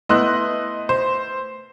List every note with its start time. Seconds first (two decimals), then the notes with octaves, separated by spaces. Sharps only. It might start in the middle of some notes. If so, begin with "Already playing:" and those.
0.09 A3 B3 E4 D#5 C6 F#6
0.89 C5